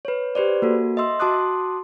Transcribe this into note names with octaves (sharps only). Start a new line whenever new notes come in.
B4 C#5
G4 B4 C5 D5
A#3 F#4 A4
D#5 E5 C6 E6
F#4 A5 C6 D6 D#6 F#6